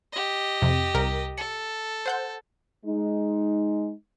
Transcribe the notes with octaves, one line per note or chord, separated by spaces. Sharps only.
G4 D#5
F2 C3
C2 A#4
A4 C#7
C5 F#5 G6
G#3 D#4